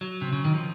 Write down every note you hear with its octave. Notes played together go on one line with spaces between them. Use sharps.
F#3
C3
C#3
D#3
F3